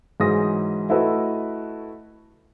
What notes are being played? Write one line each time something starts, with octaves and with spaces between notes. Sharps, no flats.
G#2 E3 F#3 G#4 D#6 A#6
A3 E4 F#4 A4 B4 D#5